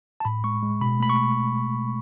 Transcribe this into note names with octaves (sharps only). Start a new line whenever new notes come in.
A5
A2 B5
G#3 C#6
G#3
B2 B5
A3 B5
C#6